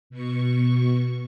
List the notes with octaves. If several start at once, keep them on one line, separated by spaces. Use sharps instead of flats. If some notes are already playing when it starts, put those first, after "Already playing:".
B2 C#6